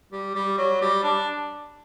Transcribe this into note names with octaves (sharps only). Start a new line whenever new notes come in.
G3
G3
F#3
G3
D4